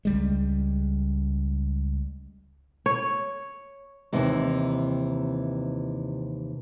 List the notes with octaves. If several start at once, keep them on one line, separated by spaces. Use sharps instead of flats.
C#2 G3 G#3
C#5
D#2 C3 E3 D#4